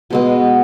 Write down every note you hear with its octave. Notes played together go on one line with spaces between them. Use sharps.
B2 G#3 B3